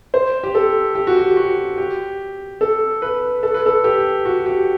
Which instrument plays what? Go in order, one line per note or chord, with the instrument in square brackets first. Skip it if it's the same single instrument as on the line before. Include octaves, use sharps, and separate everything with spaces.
[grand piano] C5
G4
A4
G4
F#4
G4
F#4
G4
A4
B4
A4
B4
A4
G4
F#4
G4